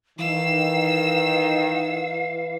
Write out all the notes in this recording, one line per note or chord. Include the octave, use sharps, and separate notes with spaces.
D#3 E3 F5 E6